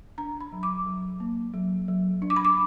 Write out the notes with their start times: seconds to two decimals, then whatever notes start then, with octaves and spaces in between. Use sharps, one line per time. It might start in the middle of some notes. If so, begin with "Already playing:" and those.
0.18 D4 A#5
0.41 B5
0.52 F#3
0.63 D6
0.86 F#3
1.20 A#3
1.54 F#3
1.88 F#3
2.22 D4
2.30 D6
2.36 B5
2.45 D6